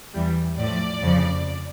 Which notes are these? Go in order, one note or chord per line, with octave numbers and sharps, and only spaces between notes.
E2 E3 G3
A2 F3 D5
F2 C#3 F3